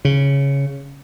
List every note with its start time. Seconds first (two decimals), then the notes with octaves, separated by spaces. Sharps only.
0.05 C#3